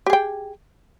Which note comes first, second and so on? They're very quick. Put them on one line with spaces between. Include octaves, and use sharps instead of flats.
G4 G#4 G5